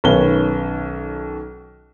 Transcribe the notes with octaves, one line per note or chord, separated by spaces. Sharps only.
B1 D#3 C#4 B4 G7